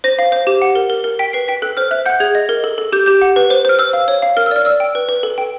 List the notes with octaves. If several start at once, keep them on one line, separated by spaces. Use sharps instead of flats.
C5 A#6
F5
C5
G4
F#5
A#4
A#4
A#4
G5 B6
B4 C7
G5 B6
A4 F#6
C5 F6
E5 F#6
F#5 G6
G#4 G#6
D#5
A#4
A4
A4
G4 G6
G4 G6
F#5
B4
C5
C5 F6
C5 E6
F5
C#5
F5
A#4 F6
E6
D5 F6
D5 E6
G5
B4
B4
A4
G5